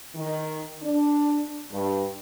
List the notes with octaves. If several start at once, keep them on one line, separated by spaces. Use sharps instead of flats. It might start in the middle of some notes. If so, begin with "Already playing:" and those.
D#3
D4
G2